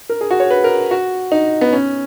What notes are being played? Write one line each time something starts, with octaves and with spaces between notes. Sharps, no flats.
A#4
G#4
F#4
C#5
B4
A#4
F#4
D#4
B3
C#4